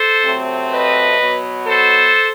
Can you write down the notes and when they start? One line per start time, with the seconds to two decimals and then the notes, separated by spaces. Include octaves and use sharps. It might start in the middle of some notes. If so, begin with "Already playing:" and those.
Already playing: A4 C5
0.22 C3 F#3 A3 C4
0.70 B4 D#5
1.19 B2 F#3 B3
1.67 A4 C5